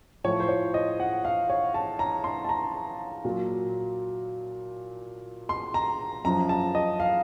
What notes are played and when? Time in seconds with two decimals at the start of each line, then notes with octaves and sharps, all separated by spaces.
0.24 A2 F3 C#5
0.40 C5
0.49 C#5
0.74 D#5
1.00 F#5
1.25 F5
1.50 C#5
1.74 A5
1.99 A#5
2.24 C6
2.45 A5
2.49 A#5
3.25 A#2 F#3
5.49 C6
5.74 A#5
6.25 F#2 F3 A#5
6.49 A5
6.75 D#5
7.00 F5